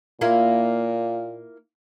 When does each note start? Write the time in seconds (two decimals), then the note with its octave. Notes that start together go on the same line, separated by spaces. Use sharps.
0.21 A#2 A#3 E4 F4